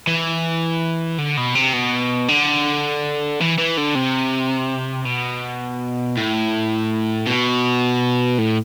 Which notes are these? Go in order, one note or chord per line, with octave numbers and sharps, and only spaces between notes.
E3
D3
B2
C3
B2
D3
E3
E3
D3
C3
B2
A2
B2
A2